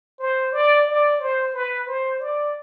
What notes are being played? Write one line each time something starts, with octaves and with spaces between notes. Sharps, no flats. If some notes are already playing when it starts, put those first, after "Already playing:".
C5
D5
D5
C5
B4
C5
D5